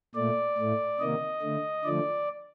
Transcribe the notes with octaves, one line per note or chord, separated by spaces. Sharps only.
A#2 A3 D5
A2 A3
C3 D#3 A#3 D#5
D3 A3
D3 F3 A3 D5